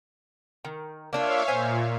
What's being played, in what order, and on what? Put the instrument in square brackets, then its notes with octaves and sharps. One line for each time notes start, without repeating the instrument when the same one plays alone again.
[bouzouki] D#3
[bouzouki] A#3 D4 F4 [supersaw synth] C#5 E5 F5
[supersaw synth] A#2 [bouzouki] C5 G#5